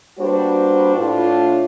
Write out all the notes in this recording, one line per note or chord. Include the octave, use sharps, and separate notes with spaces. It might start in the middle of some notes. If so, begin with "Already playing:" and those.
G3 A#3 D4 F#4 B4 C5
A2 D4 F4